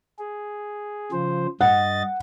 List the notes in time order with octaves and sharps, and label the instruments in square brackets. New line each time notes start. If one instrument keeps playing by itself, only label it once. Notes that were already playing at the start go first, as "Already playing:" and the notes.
[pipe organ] G#4
C#3 F3 C5
[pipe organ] G2 D#5 A6 [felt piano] F#5